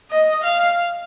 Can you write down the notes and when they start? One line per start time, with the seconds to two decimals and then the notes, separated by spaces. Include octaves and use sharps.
0.11 D#5
0.44 F5